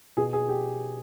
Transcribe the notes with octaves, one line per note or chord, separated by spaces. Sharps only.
B2 G#4
G#4
G4